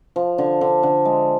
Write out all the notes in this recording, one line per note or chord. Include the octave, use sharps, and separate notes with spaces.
F3
D3
D3
D3
G#3